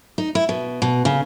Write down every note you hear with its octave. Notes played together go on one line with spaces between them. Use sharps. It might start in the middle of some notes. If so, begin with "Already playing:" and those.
D#4
E4
B2
B2
C#3